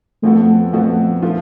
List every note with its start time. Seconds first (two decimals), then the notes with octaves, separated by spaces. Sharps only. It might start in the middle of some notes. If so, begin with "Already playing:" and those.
0.23 F2 F3 A3 B3 F#4 A4
0.73 F2 F3 A3 B3 F#4 A4
1.22 F3 A3 F4